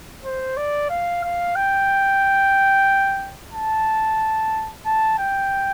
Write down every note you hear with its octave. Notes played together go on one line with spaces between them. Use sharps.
C5
D5
F5
F5
G5
A5
A5
G5